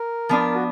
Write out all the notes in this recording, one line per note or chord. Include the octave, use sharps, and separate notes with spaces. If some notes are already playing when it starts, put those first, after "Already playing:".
Already playing: A#4
F3 B3 D4
F#4